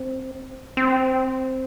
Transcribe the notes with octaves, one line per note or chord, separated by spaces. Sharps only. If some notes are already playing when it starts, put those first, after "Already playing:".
Already playing: C4
C4